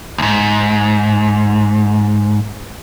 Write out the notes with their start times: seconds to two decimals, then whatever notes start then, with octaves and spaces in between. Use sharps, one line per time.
0.18 D2 G#2